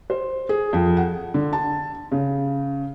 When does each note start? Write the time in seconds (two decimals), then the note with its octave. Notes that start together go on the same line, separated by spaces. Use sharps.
0.10 C5
0.49 G#4
0.73 F2
0.97 F#5
1.34 D3
1.53 A5
2.12 C#3